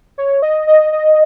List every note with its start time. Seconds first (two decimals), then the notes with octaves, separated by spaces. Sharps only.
0.18 C#5
0.42 D#5
0.67 D#5
0.93 D#5